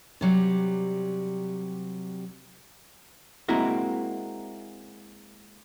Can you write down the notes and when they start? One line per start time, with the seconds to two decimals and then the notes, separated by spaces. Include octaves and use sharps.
0.21 C3 F#3 G3
3.49 G#3 A#3 C4 E4 F#4 A#4